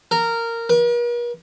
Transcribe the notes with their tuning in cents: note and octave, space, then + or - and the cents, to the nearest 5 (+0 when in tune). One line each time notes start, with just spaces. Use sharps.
A#4 -15
A#4 +45